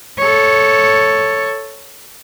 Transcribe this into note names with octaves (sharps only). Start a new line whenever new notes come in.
A4 C#5